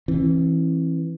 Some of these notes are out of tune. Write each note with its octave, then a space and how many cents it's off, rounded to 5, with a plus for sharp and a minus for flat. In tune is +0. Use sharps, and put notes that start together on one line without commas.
E3 +0 C4 +45